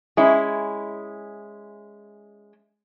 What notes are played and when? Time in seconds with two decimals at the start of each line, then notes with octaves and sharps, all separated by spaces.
0.17 G#3 C#4 E4